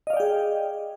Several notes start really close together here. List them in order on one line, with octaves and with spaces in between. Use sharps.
D#5 F5 D5 G5 G#4